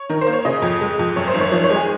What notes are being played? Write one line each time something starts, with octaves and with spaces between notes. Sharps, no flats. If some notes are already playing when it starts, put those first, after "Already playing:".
Already playing: C#5
D#3 A#4
C5
A#3
C#5
C#3 D#5
F2
G#3
F2
F#2 C#5
C5
G#1
C#5
F3 C#5
C#5
G#3
G#4